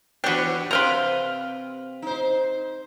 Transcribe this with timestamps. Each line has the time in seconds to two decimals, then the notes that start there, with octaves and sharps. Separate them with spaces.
0.24 E3 B3 D4 F#4 G4 B4 C#5
0.71 C3 C4 B4 F5 G5 A#5 C6
2.02 D#4 C5